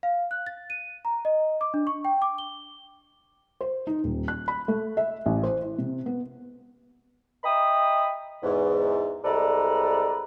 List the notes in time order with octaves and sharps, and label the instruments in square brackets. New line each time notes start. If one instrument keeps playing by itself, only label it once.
[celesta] F5
F#6
A6
D#7
A#5
D#5
D6
D4
C#6
G5
D6
G7
[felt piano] C5
D#4
D#1
F#6
B5
A3
E5
A1
C5
E4
C3
B3
[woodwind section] D#5 E5 G5 A#5 B5 D#6
E2 G#2
C2 G#3 A4 B4 D5 A#5